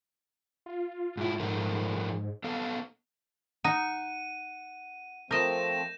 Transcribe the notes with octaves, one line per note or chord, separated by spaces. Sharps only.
F4
G#2 E4
G#2 F3 A3 A#4
B3 A4 F5
D#4 F#5 D#7
F3 A3 C4 A#4 D#5 G6 A#6 E7